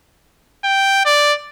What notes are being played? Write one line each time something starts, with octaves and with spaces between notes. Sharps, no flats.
G5
D5